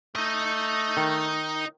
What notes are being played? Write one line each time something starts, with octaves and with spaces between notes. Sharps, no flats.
A3 D#4 D#5
D#3